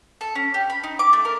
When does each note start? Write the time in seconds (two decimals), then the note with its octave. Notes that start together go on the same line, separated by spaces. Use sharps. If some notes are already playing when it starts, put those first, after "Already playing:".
0.21 A4
0.35 C#4
0.54 G4
0.70 B5
0.84 D#4
0.99 D6
1.13 A3
1.25 A#4